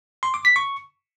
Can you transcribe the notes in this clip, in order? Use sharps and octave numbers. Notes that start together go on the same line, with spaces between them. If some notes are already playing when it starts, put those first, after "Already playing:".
C6
D6
B6
C#6